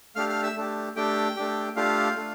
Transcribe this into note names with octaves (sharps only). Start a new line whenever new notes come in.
A3 D4 G4 F5 F6
F5 F6
E5 E6
A3 D4 G4
A3 D4 G4 G5
A3 D4 G4
A3 D4 F4 G4 F5
A3 D4